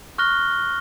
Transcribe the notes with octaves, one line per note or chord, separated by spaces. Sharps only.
C#6 F6 F#6 A#6 G7